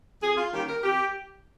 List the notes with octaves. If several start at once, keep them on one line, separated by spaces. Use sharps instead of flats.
F2 G#4
F4
D#3 G3 A#3 C#4 G4
A#4
F2 G4